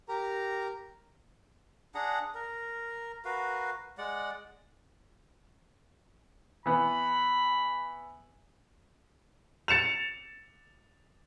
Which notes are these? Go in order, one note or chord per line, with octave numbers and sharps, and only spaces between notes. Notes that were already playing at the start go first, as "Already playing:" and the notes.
G4 A#4 A#5
D4 G#4 F#5 A#5
A#4
F#4 A#4 B4 F5
G#3 D5 F#5
E3 B3 B5
A6 C#7 E7 F7